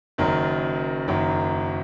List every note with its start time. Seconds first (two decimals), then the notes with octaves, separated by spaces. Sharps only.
0.18 F#1 F#2 D#3 F#3
1.08 F#1 F#2 D#3 F#3